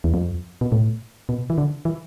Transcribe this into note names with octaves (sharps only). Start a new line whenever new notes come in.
E2
F2
B2
A2
B2
E3
D3
E3